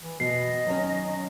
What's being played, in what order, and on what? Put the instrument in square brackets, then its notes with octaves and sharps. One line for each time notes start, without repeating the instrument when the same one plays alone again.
[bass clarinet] E3
[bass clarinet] B2 [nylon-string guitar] B3 [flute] D#5 [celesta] C7
[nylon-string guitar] D#3 C#4 [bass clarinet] F#3